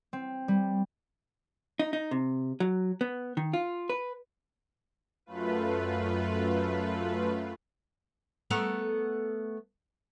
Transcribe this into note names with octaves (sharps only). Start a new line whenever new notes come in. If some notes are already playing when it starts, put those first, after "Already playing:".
C4
G3
D#4
D#4
C3
F#3
B3
D#3
F4
B4
F#2 A3 F4 B4
A3 B3 A#4